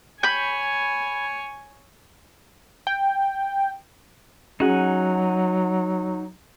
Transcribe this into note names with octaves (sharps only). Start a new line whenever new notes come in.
C#5 G#5 B5 G6
G5
F#3 C#4 D#4 F#4 G#4 F#5 G#5